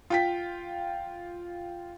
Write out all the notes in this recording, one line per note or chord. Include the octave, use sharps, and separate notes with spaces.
F4 G5 B6